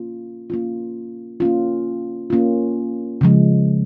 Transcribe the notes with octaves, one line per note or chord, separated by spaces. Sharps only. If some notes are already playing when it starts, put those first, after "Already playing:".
Already playing: A#3 C#4 F4
A#3 C#4 F4
A#3 C#4 F4
A#3 C#4 F4
C#3 F3 G#3